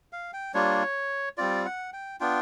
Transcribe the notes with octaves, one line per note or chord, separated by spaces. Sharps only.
F5
G5
G3 A#3 D4 F4 C#5
G3 C4 F4 D5
F#5
G5
B3 D4 F4 G5